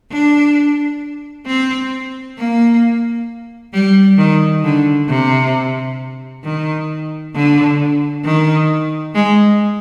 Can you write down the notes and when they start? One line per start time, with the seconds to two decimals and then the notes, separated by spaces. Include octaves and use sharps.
0.11 D4
1.47 C4
2.38 A#3
3.73 G3
4.18 D#3
4.64 D3
5.09 C3
6.44 D#3
7.34 D3
8.24 D#3
9.15 G#3